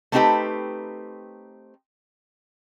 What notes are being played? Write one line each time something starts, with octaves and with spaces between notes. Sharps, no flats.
A3 B3 C4 D#4 G4 B4